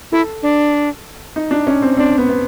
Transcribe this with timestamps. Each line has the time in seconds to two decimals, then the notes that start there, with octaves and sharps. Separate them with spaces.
0.12 E4 A4
0.43 D4
1.36 D#4
1.51 D4
1.67 C#4
1.82 C4
1.97 C4 D4
2.18 B3
2.29 B3